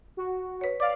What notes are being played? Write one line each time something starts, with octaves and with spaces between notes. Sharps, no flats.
F#4
B4 C#5
D5 F5 D6